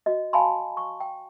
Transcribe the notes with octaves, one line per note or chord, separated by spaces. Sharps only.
F#4 D#5
F5 G#5 A5 B5 C6
C#6
G5